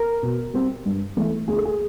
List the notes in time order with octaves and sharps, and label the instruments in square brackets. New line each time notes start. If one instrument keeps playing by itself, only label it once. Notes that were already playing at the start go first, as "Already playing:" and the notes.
Already playing: [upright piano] A#4
B2
G3 C4
G2
E3 A3
D2 G#4
A4
G#4